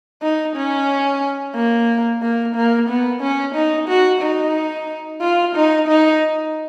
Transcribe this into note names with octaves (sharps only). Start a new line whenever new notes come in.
D#4
C#4
A#3
A#3
A#3
B3
C#4
D#4
F#4
D#4
F4
D#4
D#4